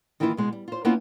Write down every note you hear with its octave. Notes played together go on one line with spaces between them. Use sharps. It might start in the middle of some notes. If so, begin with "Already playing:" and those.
D#3 E3 A#3 C#4 E4 F4
B2 G#3
G3
F4 C5
A#3 B3 C#4 E4 F4 C5